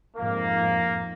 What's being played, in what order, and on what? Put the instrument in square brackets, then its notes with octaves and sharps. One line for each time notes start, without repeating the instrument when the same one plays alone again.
[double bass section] F2 G#2 [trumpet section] A#3